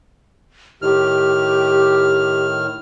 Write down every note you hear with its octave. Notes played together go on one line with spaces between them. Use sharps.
A2 D#3 G4 F6